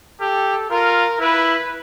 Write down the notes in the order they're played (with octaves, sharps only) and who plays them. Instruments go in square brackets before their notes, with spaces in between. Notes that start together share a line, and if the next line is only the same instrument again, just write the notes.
[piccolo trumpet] G4 [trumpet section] A4
[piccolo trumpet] F4 [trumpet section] A#4
[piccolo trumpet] E4 [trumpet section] B4